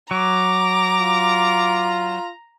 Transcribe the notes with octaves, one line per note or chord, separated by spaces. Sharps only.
F#3 A#5 D6
F4